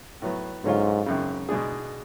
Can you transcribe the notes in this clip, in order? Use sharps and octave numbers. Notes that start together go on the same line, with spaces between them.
A2 F#3 B3
G#2 D3 F#3 C#4 F4
G#1 F#2 C#3
B2 G#3 D4 G#4